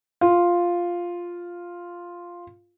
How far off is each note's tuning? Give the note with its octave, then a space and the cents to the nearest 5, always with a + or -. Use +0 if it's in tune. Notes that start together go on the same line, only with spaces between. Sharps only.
F4 +0